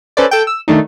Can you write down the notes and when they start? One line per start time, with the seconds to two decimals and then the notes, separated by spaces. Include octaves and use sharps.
0.17 C#4 A4 B4 C5 D5
0.31 A4 G5
0.47 E6
0.68 D#3 A3 D4 D#4